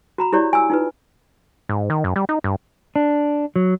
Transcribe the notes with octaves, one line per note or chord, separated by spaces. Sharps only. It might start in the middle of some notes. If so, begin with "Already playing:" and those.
F#4 A#5 B5
E4 G4 C#5 D5
G#5 E6
D#4 F4 B4
G#2
D#3
F#2
G3
D#4
G2
D4
F#3